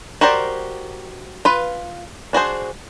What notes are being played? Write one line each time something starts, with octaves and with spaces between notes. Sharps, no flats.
F#4 G4 A#4 C5 D5
F4 B4
D4 F#4 G#4 C5